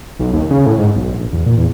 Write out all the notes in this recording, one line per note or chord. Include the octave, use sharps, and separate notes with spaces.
B1
D#2
C#3
A2
G#2
B1
A#1
E2
A#2
E2